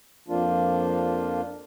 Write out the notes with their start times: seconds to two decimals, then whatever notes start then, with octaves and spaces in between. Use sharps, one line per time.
0.28 F2 F3 A#3 D4 F4